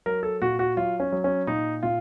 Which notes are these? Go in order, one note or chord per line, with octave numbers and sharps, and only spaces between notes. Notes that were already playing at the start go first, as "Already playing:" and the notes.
F#3 A#4
A4
A#2 F#4
F#4
F#3 F4
C#4
F#3
C#4
A#2 D#4
A#2 F4